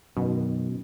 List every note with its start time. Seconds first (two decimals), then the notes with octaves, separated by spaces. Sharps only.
0.17 F#2 B2 D#3